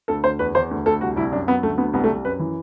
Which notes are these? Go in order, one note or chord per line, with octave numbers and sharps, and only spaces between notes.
D2 A4
D2 C5
E2 B4
E2 C5
D2
D2 A4
C2 F#4
C2 E4
F#2 D4
F#3 B3
D2 A3
D2 B3
C2 B3
A3
C2
F#2 B4
E3